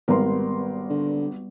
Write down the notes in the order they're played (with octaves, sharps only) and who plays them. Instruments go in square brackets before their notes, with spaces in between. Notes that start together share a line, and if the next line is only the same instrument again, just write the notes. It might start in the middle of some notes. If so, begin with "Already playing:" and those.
[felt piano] G#1 [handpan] G3 B3 [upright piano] A#4 B4 C6
[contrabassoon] D3